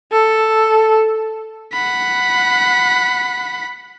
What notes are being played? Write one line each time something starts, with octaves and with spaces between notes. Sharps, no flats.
A4
F#5 B5